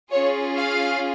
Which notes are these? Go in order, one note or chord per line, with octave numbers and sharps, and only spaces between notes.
C#4 F4 G#4 C#5
F5